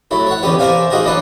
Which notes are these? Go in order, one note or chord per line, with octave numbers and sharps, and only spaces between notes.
F#3 A3 E4
C#5 F#5
E2 C3 C4 C#4 G4 B4
A#4 C5 D5 E5 F5 G#5
A#3 D#4 F#4 G#4 A#4
E3 F#3 A#3 D4 B4